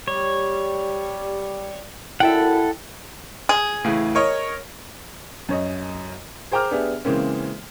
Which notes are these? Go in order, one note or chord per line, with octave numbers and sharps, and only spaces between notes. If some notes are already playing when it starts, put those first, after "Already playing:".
G3 C#5
F#2 E4 A4 E5 F#5 G5
G#4
A2 C#3 E3
A#4 C#5 D#5
F#2 C#5 D#5
G#4 C5 G5 A#5 D6 F6
B3 D4 G4 G#4 E5
C#3 E3 G#3 A#3 C4 C#4